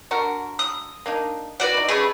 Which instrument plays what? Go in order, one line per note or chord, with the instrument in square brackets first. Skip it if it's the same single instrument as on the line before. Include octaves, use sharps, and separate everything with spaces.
[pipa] D3 F#4 A#4
[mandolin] D#6
[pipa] A#3 D4 D#4
[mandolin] F#4 D5 [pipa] B4 F#5
[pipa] D#4 E4
[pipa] G3 A3 C#4 [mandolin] G#4 B4